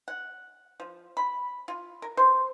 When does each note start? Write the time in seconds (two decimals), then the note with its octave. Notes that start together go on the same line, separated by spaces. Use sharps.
0.08 F#5
0.80 F3
1.17 B5
1.68 F4
2.02 A#4
2.17 C5